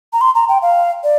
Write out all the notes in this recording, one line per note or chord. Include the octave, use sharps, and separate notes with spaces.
A#5
C6
A#5
G5
F5
D5